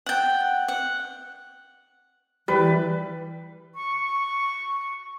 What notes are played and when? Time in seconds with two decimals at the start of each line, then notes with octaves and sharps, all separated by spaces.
0.06 F#5 G5
0.68 F#5
2.48 E3 G3 B4
3.74 C#6